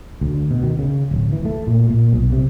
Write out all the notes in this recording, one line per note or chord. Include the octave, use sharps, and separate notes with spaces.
D2
B2
D#3
C#3
D1
E3
A3
A#2
A#2
B1
C3